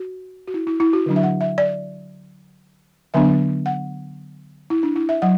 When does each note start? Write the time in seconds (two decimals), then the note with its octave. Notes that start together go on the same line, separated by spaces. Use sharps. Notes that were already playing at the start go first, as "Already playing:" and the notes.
Already playing: F#4
0.47 F#4
0.54 E4
0.67 E4
0.80 E4
0.93 F#4
1.06 D3 F#3 D4
1.16 E5
1.23 F#5
1.41 E5
1.58 D5
3.14 D3 F#3 B3 D4 E5
3.66 F#5
4.70 E4
4.83 D4
4.96 E4
5.09 E5
5.22 F#3 F#5